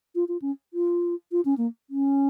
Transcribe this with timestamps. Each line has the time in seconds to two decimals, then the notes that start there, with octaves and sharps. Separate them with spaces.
0.15 F4
0.28 F4
0.42 C#4
0.74 F4
1.32 F4
1.45 C#4
1.57 A#3
1.90 C#4